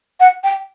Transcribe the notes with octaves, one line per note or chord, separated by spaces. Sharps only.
F#5
G5